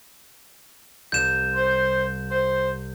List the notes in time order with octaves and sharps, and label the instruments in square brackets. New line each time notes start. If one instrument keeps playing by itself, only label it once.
[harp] C2 [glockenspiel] G6 E7
[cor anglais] C5
C5